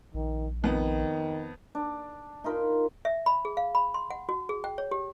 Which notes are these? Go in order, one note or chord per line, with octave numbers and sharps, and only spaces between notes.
A#1 D#3
F2 D#3 B3
D4
D#4 F4 A#4 B5
E5
B5
G#4
F5
B5
C6
F#5
F#4
G#4
G5
C#5
G4